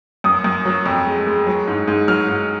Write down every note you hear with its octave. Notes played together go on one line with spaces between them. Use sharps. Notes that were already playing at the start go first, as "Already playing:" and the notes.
F#2 D#6
F#2
F#3
F2
G#3
G#3
F#3
G#2
G#2
F#3 F6
G#2